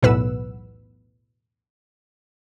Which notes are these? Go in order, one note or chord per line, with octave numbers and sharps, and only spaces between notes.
B1 E2 A2 B4 F#5 E6